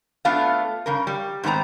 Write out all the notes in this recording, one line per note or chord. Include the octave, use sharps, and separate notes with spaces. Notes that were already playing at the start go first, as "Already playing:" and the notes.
A3 B3 D4 F4 A4 F5
G2 C#3 A#4
G3
G#2 D#3 B3 C4 A#5